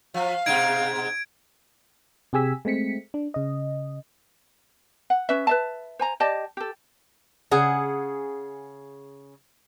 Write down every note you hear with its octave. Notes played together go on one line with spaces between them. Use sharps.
F3 F5
G#2 B2 D#4 G#6 D7
C3 G4 G#4 G#5 E6 B6
G#3 A3 C4 B6 C#7
D4
C#3 D#5
F#5
C#4 B4 E5
B4 E5 A5
C5 G#5 A#5
G4 D5 D#5 A5
G4 A4
C#3 G#4 F#5